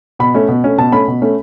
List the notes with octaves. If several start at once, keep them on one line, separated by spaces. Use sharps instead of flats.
B2 B5
A3 C#4
B2
A3 C#4
B2 A5
A3 C#4 B5
B2
A3 C#4